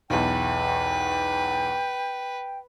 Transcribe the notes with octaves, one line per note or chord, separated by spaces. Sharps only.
B1 E2 B4 G5